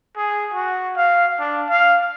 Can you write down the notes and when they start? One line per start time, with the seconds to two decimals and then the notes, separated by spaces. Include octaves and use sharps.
0.16 G#4
0.53 F#4
0.96 F5
1.39 D4
1.69 F5